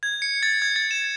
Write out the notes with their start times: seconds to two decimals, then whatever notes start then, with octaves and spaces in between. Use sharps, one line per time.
0.03 G#6
0.22 C#7
0.43 A6
0.62 G#6
0.76 A6
0.91 E7